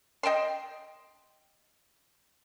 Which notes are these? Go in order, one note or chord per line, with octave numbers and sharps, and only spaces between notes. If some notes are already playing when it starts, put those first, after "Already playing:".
D#5 G5 A5 C6